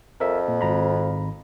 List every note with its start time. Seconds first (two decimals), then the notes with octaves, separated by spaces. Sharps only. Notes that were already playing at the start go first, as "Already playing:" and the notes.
0.20 F2 A#4 E5
0.48 A#2
0.61 G#1 A#5 B5